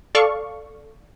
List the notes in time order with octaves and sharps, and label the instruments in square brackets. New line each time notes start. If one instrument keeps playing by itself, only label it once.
[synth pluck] A4 D5 F5 C#6